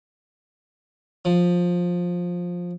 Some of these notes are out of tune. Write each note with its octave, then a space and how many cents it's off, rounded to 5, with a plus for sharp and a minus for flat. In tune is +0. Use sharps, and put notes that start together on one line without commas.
F3 +15